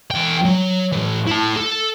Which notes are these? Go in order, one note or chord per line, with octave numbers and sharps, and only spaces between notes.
E2 G5
F#3
A2 E3
E4 A5
A4